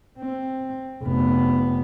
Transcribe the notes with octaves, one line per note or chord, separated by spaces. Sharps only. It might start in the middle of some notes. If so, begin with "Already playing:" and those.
C4
F1 B3